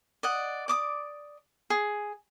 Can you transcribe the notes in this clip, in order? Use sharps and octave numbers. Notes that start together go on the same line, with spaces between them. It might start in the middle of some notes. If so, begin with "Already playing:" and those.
D5 D#5 F#5
D5 D6 D#6
G#4